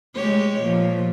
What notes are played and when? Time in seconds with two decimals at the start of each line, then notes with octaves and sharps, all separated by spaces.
0.15 G#3 G4 C#5
0.61 A#2 F3